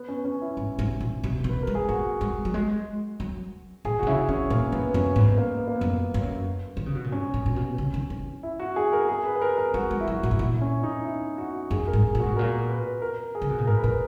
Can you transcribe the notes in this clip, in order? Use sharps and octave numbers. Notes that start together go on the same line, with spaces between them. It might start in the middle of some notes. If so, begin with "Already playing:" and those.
Already playing: B3
C#4
C#4
E4
G#2
G#2
A#2
B2
B2
B4
G#3 A#4
G#4
A#3 F#4
G#3
F#3
G#3
F#3
A#2 G#4
F#4
B2
C#3 E4
D#3 C#4
A#2 A#3
F#2 B3
F#2 C#4
G#2 B3
A#3
B3
A#3
B3
F#2
F#2
D#3
C#3
B2
A#2
G#2 C#4
A#2
A#2
B2
C#3
D#3
E3
E4
F#4
G#4
A#4
G#4
B4
B4
A#4
A#4
G#3 F#4
G#3
E4
F#3 F#4
A#2
G#2
A#2 E4
C#4
D#4
E4
F#4
F#2 G#4
A#4
G#2
G#4
A#2
F#4
G#2
A#2 A#4
B4
A#4
G#4
C#3
B2
A#2
G#2 A#4
B4
A#2 A#4